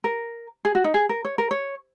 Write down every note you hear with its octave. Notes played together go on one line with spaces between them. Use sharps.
A#4
G#4
F#4
D#4
G#4
A#4
C#5
A#4
C#5